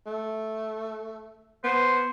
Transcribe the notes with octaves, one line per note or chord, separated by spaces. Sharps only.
A3
B3 C5